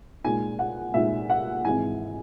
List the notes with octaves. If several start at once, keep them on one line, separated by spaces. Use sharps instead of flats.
A#2 G#3 D#4 G#5
F#5
A#2 G#3 D#4 E5
F#5
G#1 G#2 E3 G#5